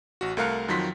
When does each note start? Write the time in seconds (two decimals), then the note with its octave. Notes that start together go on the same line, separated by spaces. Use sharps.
0.21 A1 F#4
0.37 C2 A3 A#4 F5 F#6 C#7
0.68 F2 D#3 F3 F#3 C6 B6